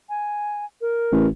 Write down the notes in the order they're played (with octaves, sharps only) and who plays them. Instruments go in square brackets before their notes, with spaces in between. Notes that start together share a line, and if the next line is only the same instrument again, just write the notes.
[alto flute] G#5
A#4
[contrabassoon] A1